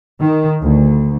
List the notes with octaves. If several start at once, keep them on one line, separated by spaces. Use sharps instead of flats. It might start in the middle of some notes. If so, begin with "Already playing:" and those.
D#3
D2